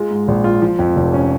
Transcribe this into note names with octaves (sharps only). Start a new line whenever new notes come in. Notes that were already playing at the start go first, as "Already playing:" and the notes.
Already playing: G#3 F4
G#2
A#1
F4
F3
F2
F1
C#4